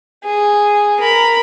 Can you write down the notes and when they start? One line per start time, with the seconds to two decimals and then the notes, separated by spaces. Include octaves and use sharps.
0.24 G#4
1.00 A#4 B5